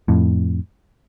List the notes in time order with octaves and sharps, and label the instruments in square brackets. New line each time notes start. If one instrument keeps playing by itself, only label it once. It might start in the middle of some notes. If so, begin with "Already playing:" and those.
[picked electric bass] F2 A2